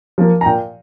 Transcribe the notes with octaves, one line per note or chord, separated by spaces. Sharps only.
F3 A#3
A#5
A#2 G5